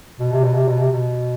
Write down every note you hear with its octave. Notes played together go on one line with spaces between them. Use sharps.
B2
C3
B2
C3
B2
C3
B2